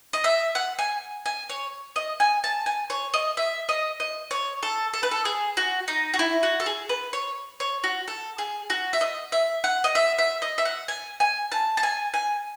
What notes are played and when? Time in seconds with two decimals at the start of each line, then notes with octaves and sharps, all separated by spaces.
0.13 D#5
0.24 E5
0.55 F#5
0.79 G#5
1.26 G#5
1.49 C#5
1.96 D#5
2.20 G#5
2.44 A5
2.66 G#5
2.90 C#5
3.14 D#5
3.37 E5
3.69 D#5
4.00 D#5
4.31 C#5
4.63 A4
4.94 A4
5.03 B4
5.11 A4
5.25 G#4
5.57 F#4
5.88 D#4
6.14 F#4
6.19 E4
6.43 F#4
6.60 A4
6.66 G#4
6.89 B4
7.13 C#5
7.60 C#5
7.84 F#4
8.08 A4
8.38 G#4
8.70 F#4
8.93 E5
9.01 D#5
9.32 E5
9.64 F#5
9.84 D#5
9.95 E5
10.19 E5
10.42 D#5
10.58 E5
10.65 F#5
10.88 G#5
11.20 G#5
11.52 A5
11.77 A5
11.83 G#5
12.14 G#5